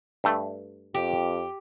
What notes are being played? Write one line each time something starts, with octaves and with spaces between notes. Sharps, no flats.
G2 A3
F2 G4